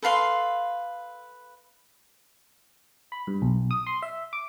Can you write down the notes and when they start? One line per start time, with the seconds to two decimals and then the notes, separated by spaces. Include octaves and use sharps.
0.03 A4 B4 F5 C6
3.12 B5
3.27 G2
3.42 B1
3.71 D#6
3.87 C6
4.02 E5
4.33 D6